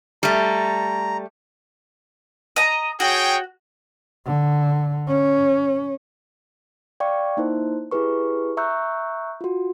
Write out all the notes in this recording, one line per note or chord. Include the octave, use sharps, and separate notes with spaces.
G3 A3 A#5
D#5 A#5
F#4 G#4 C#5 G5
D3
C#4
D5 F5 G5 C#6
A#3 D#4 E4 C5
E4 G4 G#4 B4 C#6
E5 A#5 C#6 E6 F#6 G6
F4 F#4